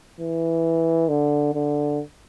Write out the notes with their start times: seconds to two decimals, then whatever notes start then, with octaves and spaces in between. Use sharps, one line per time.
0.21 E3
1.09 D3
1.54 D3